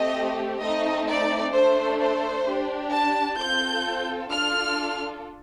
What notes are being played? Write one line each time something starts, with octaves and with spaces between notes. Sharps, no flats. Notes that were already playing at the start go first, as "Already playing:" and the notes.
Already playing: A3 C4 G4 D#5
A3 C4 D#4 D#5
D5
A3 D4 A4 C5
C5
D4 G4
A5
C4 F4 A4 G6
D4 F4 A4 F6